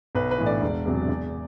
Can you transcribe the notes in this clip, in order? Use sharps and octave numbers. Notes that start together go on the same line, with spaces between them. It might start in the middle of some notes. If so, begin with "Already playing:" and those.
B1 B4
B4
A2 E3
D5
E1
E2 C3 F#3
E2